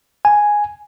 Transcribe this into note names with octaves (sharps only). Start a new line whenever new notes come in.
G#5